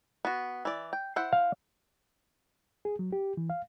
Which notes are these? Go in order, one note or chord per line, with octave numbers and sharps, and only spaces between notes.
B3 F#4
E3 D5
G5
E4 C5 F#5
F5
G#4
F#3
G4
E3
F5